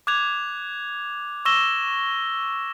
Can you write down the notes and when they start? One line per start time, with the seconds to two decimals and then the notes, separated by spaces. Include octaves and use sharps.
0.07 D6 F#6 G#6 F7
1.45 C#6 E6 A#6 E7 G7